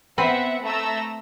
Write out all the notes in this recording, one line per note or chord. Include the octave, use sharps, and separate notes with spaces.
B3 C4 B4 E5 F#5
A3 A#5 E6